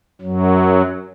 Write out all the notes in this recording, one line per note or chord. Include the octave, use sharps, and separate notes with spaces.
F#2 F#3